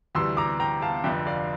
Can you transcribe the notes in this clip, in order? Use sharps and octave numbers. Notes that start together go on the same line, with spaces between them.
D2 C3 E3 G3 C6 E6
A#5 D6
G5 A#5
F5 A5
F1 F2 D3 E5 G5
D5 F5